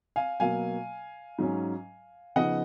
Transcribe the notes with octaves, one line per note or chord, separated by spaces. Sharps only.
F5 G#5
B2 F#3 A#3 F5 G#5
G#2 F#3 C#4
C#3 F3 B3 D#4 D#5 F#5